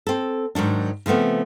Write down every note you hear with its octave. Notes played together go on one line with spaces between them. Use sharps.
C4 A4
G#2 D#3 F#3 D4
C#3 F3 A3 B3 C4